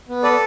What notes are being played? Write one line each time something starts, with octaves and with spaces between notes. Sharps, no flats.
B3
A4 B4 D5